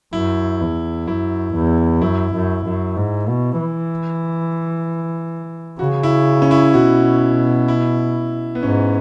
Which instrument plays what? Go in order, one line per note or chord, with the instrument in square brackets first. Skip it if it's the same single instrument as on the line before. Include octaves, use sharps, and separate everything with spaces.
[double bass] F#2 [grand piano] E4
[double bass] E2
[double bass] F#2 [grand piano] E4
[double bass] E2
[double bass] F#2 [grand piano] E4
[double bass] F#2
F#2
G#2
B2
E3
[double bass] C#3 [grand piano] F#4
[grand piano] E4
C#4
E4
[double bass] B2 [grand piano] F#4
[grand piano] E4
B3
[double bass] G#2 [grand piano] C#4